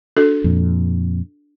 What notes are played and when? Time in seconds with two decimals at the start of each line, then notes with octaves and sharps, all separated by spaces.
0.17 D4 F#4 A4
0.44 F2 A#2